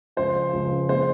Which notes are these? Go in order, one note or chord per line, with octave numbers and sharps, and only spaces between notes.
C#2 C#3 F3 C5
C#2 C#3 F3
A#2 G#3 C5